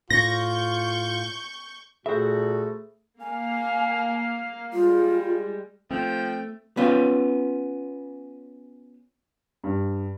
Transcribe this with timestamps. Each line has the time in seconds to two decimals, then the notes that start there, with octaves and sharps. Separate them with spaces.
0.10 A2 F4 C#6 G6 A#6
2.06 A#2 A3 F#4 G#4 A4 C5 E5 B5
3.21 A#3 F5 G#5
4.73 G3 G#3 F4
5.91 F3 A3 C4 G5
6.77 B3 C#4 F4
9.64 G2